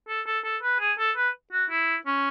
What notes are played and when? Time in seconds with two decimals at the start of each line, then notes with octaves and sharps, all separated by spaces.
0.09 A4
0.27 A4
0.45 A4
0.63 B4
0.80 G#4
0.99 A4
1.17 B4
1.53 F#4
1.70 E4
2.07 C#4